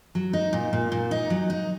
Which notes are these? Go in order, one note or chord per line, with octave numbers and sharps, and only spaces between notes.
F#3
D#4
A#2
A#2
A#2
D#4
F#3
D#4